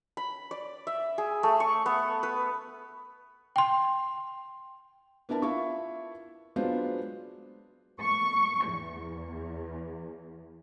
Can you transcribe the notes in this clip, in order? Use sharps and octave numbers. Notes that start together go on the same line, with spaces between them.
B5
D5
E5
G#4
A3
C#6
B3
B4
G5 C6
B3 D4 E4 A#4 A5
E4 F4 E5 C#6
F#3 G#3 B3 D4 F4 C5
C#6
E2